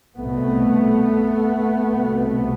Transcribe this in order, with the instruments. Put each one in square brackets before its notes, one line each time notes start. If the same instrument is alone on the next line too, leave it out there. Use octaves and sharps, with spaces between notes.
[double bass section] C2 B2 A3 B3
C2 B2